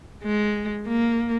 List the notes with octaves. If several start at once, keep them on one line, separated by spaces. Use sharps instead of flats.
G#3
A#3